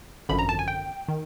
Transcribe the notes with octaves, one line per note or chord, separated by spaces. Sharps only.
G#1 F#2 D3 F3 B5
A#5
A5
G#5
G5
D#3